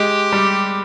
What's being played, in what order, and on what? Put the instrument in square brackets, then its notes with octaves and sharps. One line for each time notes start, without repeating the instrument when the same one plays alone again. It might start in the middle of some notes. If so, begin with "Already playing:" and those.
Already playing: [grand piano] G#3 [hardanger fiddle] G4
[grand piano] G3